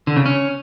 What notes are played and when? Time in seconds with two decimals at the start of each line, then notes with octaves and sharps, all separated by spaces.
0.07 D3
0.16 C#3
0.26 C#4